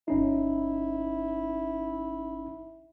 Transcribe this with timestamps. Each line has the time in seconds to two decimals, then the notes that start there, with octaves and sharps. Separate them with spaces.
0.08 G1 C#4 D#4 E4